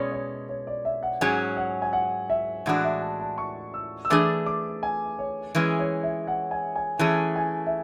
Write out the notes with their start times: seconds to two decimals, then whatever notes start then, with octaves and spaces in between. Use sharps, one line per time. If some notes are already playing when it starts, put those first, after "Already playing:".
Already playing: B2 G#3 C#4 C#5 D5
0.12 C#5
0.49 C#5
0.67 D5
0.85 E5
1.03 F#5
1.21 G#2 F#3 C#4 G#4 G#5
1.57 F#5
1.82 G#5
1.93 F#5
2.30 E5
2.66 A2 E3 G#3 D4 F#4 F#5
2.84 E5
3.02 A5
3.20 A5
3.38 C#6
3.74 E6
4.05 E6
4.10 E3 A3 D4 G#4 D6
4.46 D6
4.83 G#5
5.19 C#5
5.55 E3 G#3 C#4 G#4 B4
5.79 C#5
6.03 E5
6.27 F#5
6.51 G#5
6.76 G#5
6.99 E3 A3 C#4 G#4 A5
7.36 G#5
7.66 E5